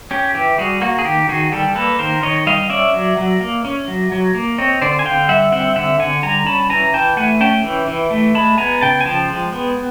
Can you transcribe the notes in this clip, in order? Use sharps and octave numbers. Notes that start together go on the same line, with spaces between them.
C#4 G4
E3 G4
G3 F#4 G#4
A#3 F#4
G#4
D#3 G4
D#3 F#4 G#4
G3 G4 A4
A#3 A4 B4
D#3 A#4 C5
D#3 C#5 D#5
G3 D#5 F5
C#4 D5 E5
F#3
F#3
A#3
C#4
F#3
F#3
A#3
C4 C#5 D#5
D3 C5 D5
G#5
D3 F5 G5
G3 E5 F#5
C4 E5 F#5
D3 E5 F#5
D3 F#5 G#5
G3 G#5 A#5
C#4 A5 B5
E3 G#5 A#5
E3 G5 A5
A3 F#5 G#5
C#4 G5 A5
E3
E3
A3
G#3 A5 B5
B3 G#5 A#5
C#3 G5 A5
G#5
F3 G5 A5
G#3
B3